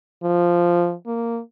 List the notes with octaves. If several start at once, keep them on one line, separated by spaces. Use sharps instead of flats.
F3
A#3